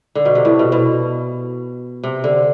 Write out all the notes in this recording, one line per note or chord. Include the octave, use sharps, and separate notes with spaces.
D3
B2
C3
A2
B2
B2
C3
D3